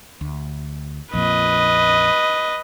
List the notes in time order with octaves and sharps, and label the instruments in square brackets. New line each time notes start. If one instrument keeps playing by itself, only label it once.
[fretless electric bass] D2
[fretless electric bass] A#1 F2 A#2 [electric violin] B4 D#5